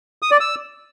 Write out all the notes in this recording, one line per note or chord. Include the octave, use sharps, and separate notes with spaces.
D#6
D5
E6